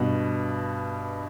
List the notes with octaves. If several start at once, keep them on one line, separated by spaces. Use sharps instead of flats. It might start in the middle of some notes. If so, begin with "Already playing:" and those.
Already playing: G2 B2